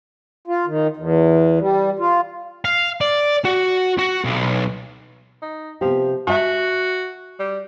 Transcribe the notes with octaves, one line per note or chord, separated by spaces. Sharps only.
F4
D#3
E2
G3
F4
F5
D5
F#4
F#4
B1
D#4
C3 F3 B3 G4
F#4 E5 G#5 A5
G3